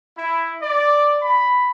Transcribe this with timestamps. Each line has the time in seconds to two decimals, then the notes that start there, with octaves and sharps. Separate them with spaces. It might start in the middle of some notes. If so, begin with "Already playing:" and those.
0.17 E4
0.62 D5
1.22 B5